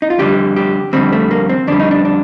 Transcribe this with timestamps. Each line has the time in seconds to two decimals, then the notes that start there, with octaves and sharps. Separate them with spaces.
0.02 D#4
0.10 F4
0.18 F2 D3 G3 G4
0.56 G4
0.93 F2 D3 G3 C4
1.12 A3
1.31 A#3
1.49 C4
1.67 F2 D3 G3 D4
1.80 D#4
1.91 D4
2.05 D4